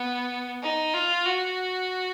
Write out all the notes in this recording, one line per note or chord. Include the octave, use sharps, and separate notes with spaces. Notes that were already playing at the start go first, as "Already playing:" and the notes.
Already playing: B3
D#4
F4
F#4